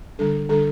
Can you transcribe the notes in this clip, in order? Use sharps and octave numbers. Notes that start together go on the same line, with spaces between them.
D3 G3 D4 A4
D3 G3 D4 A4